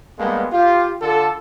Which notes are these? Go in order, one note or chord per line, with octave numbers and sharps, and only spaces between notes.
G2 G3 G#3 A#3 B3
F4 G4
D3 F4 A4